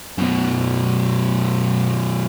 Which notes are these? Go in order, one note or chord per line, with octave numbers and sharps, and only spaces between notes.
F#2 B2